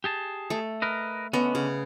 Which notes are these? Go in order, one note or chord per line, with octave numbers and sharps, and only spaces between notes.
G4 G#4 A5
A3
A#4 B4 D#5
D3 B3 C#4 D#5
C#3